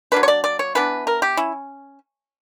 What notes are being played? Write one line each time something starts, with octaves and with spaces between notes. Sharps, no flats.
F#3 A#3 D4 B4
C#5
D5
D5
C#5
E3 B3 D4 B4
A#4
G4
C#4 E4